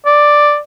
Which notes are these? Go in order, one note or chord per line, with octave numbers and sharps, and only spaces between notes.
D5